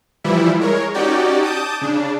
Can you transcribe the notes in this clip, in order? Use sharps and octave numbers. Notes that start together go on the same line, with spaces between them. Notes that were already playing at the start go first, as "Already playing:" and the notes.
E3 F3 G3 E4
G#3 A#4 C#5
C#4 D#4 F#4 G4 D5 G5
A5 D6 D#6 G6
C#3 D4